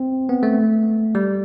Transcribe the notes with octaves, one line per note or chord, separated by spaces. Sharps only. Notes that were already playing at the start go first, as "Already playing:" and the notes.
Already playing: C4
B3
A3
G3